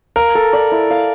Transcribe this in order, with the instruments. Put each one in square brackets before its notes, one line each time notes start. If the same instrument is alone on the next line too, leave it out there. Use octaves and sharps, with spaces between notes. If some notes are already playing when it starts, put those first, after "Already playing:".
[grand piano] A#4 [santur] F5
[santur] A4
D5
E4
F5